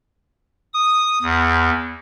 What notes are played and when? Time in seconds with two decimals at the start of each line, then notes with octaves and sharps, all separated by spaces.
0.74 D#6
1.22 E2